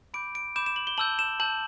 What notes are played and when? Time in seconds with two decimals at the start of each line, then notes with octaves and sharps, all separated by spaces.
0.14 B5 D6 G6 D7
0.35 D7
0.56 B5 D6 G6 E7
0.66 E7
0.76 F#7
0.87 G7
0.98 A5 E6 G6 F#7
1.19 E7
1.40 A5 E6 G6 F#7